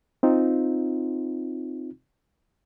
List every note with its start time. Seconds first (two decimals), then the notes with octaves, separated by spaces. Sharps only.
0.23 C4 D#4 F4